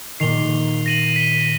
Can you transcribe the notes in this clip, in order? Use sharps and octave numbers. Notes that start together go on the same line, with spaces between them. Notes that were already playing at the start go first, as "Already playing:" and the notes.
A#2 D#3 C7 F7 G7
A#6 D#7 F#7
B6 D#7 G7